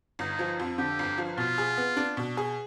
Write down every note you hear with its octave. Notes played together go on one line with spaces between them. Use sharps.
G1 D#4
F3
F2
D3 G4
G1
F3
B2 F4
G#4
B3
D4
B2
G#4